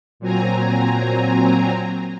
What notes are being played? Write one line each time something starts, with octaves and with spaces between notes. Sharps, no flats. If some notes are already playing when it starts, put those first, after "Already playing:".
A#2 F#3 C4 G#5 A#5